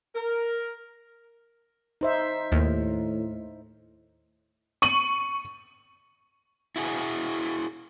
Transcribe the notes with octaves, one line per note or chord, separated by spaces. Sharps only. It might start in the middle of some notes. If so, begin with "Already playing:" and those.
A#4
D#4 C5 E5
D#2 A2
C#6 D#7 F#7
E4 F#4 G#4